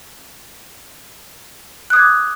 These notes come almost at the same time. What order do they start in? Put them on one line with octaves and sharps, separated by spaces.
F#6 D#6 G#6 D6